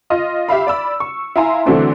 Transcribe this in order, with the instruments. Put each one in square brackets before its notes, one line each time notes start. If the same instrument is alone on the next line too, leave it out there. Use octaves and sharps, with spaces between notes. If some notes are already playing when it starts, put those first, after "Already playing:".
[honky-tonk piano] F4 D#5 F6
G4 E5 F5 B5
D5 B5 E6
C#6
E4 F5 G#5 A#5 C6
D3 E3 F#3 A3 C4 D4